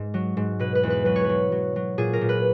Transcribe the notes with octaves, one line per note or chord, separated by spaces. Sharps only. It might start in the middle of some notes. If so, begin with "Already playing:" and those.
Already playing: G#2
F#3
G#2
B2 B4
B4
E2
B4
F#3 B4
C#5
F#3 B4
F#3
F#3
A#2 G#4
A#4
A#2
B4